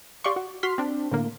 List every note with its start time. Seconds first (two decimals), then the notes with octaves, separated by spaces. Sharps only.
0.24 G4 D5 F5 C6 C#6
0.36 F#4
0.63 F#4 C6 F6 B6
0.78 C4 D4
1.11 A2 D3 A#3